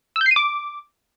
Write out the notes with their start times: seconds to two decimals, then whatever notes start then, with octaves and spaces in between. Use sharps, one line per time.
0.16 E6
0.21 G6
0.26 C7
0.31 D#7
0.36 D6